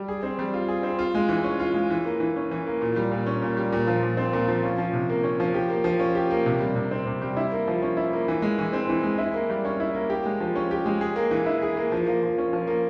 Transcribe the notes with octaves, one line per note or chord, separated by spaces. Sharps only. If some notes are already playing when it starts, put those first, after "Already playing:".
Already playing: G3
G#4
C4
G3
F4
G#4
C4
F4
G#3
E3
C#4
F4
G#3
E3
A#3
E3
C#4
E3
A#3
A#2
G3
A#2
C#4
A#2
G3
A#2
F3
A#2
C4
A#2
F3
C#4
F3
C3
A#3
C#4
F3
G4
A#3
F3
C#4
G4
A#3
C3
G3
C3
C4
C3
G3
E4
A#3
F3
C#4
E4
A#3
E3
G#3
E3
C4
E3
G#3
E4
A#3
G3
C#4
E4
A#3
G4
G#3
F3
C#4
G4
G#3
G#4
A#3
E3
E4
G#4
A#3
F3
A#3
F3
C#4
F3
A#3